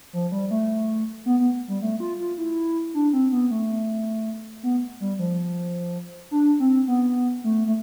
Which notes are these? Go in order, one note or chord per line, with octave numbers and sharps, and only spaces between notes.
F3
G3
A3
B3
B3
G3
A3
F4
F4
E4
D4
C4
B3
A3
B3
G3
F3
D4
C4
B3
A3
A3